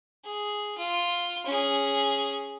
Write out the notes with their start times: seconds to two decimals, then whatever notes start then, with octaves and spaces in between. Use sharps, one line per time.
0.25 G#4
0.78 F4
1.46 C#4 G#4